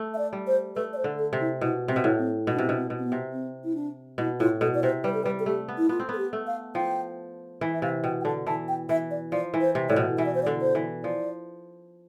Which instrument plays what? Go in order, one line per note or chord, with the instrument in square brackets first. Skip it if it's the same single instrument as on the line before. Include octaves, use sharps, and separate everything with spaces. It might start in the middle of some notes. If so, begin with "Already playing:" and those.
Already playing: [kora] A3
[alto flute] E5
D5
[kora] G3
[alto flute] C5
[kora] A3 [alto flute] B4
[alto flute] D5
C5
[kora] D3
[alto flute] A4
[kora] C3
[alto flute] E4
[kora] B2 [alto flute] E4
[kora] C3 [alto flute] C4
[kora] B2
A2
[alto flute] C4
[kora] B2 [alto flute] E4
[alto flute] D4
[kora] C3 [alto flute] C4
[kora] B2 [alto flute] D4
[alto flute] C4
[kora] B2
[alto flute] C4
B3
[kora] C3
[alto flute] C4
E4
D4
[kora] B2 [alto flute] E4
[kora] A2 [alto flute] F4
[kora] B2 [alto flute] A4
[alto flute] D5
[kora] C3 [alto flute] C5
[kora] G3 [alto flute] B4
[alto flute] A4
[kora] G3 [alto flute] B4
[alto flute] A4
[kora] A3 [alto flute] G4
[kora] B3
[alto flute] E4
[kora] B3 [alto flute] F4
[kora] C4
[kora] B3 [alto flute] A4
[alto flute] G4
[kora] A3
[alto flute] F5
[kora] F3 [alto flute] G5
[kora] E3
[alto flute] E5
[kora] C3 [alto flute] F5
[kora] B2 [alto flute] G5
[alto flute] G5
[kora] D3 [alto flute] A5
[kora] E3 [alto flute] A5
[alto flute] G5
[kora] E3 [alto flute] E5
[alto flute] D5
[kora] F3 [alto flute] D5
[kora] E3
[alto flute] C5
[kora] C3
[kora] A2 [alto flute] D5
[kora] B2
[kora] E3 [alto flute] E5
[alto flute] D5
C5
D5
[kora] D3
[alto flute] C5
[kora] E3
[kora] F3 [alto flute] D5